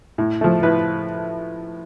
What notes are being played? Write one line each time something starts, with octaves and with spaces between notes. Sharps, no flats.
A2
F3 A3
A2 B4